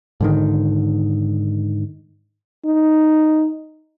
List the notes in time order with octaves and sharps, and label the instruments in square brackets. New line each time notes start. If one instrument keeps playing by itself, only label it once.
[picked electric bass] G#2 D3 D#3
[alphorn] D#4